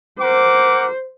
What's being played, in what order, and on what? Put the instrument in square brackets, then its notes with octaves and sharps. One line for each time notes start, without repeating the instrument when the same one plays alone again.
[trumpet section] A#4 F#5 D6 [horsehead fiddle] C5